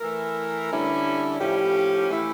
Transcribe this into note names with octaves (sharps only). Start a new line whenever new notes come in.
E3 A3 E4 A#4
D3 G3 C#4 E4
A2 F3 C#4 G4
E3 A3 E4